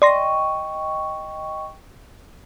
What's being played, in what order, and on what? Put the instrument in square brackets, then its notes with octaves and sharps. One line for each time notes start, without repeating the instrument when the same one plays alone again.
[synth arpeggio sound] D5 C6 A#6 [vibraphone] D#5 G5 C#6